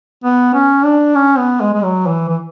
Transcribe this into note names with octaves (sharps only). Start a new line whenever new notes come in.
B3
C#4
D4
C#4
B3
G#3
G#3
F#3
E3
E3